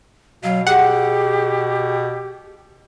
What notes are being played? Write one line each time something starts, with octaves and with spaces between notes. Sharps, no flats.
B2 F#3 F5
G4 G#4 F#5